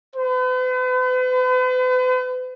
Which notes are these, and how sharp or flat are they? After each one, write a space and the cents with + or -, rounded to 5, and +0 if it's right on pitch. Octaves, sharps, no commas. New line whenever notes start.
B4 +45